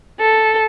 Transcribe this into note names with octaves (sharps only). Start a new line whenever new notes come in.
A4